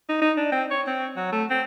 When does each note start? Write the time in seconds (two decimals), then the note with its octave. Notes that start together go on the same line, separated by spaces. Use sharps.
0.09 D#4
0.22 D#4
0.37 D4
0.52 C4
0.71 C#5
0.87 C4
1.16 F#3
1.32 A3
1.50 C4